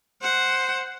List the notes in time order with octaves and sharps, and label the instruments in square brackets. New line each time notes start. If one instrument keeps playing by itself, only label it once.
[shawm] C5 [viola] F#5